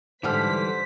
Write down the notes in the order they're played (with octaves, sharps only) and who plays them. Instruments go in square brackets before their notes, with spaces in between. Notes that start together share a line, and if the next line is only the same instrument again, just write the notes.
[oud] G#2 D3 A4 [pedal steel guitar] E3 G3 F6 [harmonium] C5 [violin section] B6